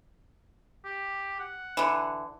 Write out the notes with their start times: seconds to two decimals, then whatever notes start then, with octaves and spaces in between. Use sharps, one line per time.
0.85 G4
1.39 F#5
1.77 D3 E3